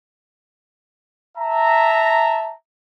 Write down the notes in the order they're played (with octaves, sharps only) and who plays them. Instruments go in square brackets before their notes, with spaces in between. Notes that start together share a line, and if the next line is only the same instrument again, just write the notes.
[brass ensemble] E5 A5 A#5